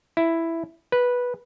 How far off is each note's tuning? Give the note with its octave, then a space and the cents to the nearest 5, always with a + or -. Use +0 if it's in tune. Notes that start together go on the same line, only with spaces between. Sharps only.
E4 +5
B4 -10